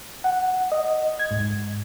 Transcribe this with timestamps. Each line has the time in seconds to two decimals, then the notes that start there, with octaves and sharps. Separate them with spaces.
0.24 F#5
0.72 D#5
1.19 G#6
1.31 G#2